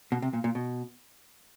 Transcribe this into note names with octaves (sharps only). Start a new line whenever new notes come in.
B2
C3
A#2
A#2
B2